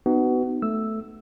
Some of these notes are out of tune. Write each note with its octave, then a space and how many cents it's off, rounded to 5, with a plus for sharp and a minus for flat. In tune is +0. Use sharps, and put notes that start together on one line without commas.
B3 +20 D#4 -25 F#4 +25
A3 +0 E6 +0